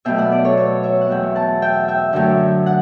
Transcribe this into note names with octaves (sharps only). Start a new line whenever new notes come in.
B2 F#3 A3 E5 G5
D5 F#5
B4 D5
A4 C#5
C#5 E5
C#5 E5
F#5
E2 B2 F#3 A3 E5 G5
F#5 A5
E5 G5
E5 G5
F#2 D3 F#3 A3 E5 G5
F#5